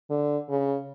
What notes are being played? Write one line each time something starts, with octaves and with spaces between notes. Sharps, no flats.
D3
C#3